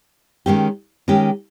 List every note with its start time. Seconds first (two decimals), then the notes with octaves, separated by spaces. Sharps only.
0.46 D#3 G#3 C#4 G4
1.08 D#3 G#3 C#4 G4